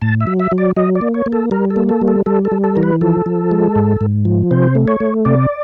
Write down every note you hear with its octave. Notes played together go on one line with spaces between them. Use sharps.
A2 A5
E5
F#3
E5
F#3
D5
F#3 D#5
D5
A#3
C#5
A#3
A4
G3 A#4
A4
A#3
A4
G3
A4
G3 A4
A4
G3
A4
E3 A#4
B4
F3 A4
F3
G#3
G#2
G#2
F3
C3 C5
A3
C#5
A3
C3 D5